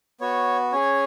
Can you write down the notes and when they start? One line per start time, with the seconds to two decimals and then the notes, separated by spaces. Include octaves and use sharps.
0.21 B3 F#4 C#5
0.72 C#4 G#4 C#5